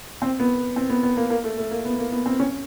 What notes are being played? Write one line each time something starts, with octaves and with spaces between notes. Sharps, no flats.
C4
B3
C4
B3
B3
A#3
A#3
A3
A3
A#3
B3
A#3
B3
C4
C#4